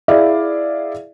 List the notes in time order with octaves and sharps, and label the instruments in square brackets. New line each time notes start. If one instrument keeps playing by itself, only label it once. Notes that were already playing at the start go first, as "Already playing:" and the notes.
[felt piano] E4 G#4 D5 E5 F5